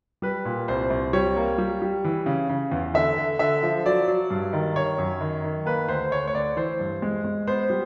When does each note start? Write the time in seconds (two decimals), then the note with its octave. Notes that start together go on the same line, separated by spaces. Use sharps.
0.22 G3 B4
0.45 A#2
0.68 C2 C5
0.90 C2
1.13 G3 C#5
1.36 A#3
1.58 G3
1.82 G3
2.04 E3
2.26 C#3
2.49 C#3
2.72 E2
2.94 D3 E5
3.18 D3
3.39 D3 E5
3.63 F3
3.85 F#3 D5
4.08 F#3
4.30 G2
4.53 D#3
4.76 D#3 C#5
4.98 F#2
5.21 D#3
5.44 D#3
5.66 A#3 B4
5.88 D2 C5
6.11 D2 C#5
6.27 C#5
6.34 D2 D5
6.57 E3 C5
6.80 G2
7.02 G#3
7.25 G#3
7.47 B3 C5
7.70 G3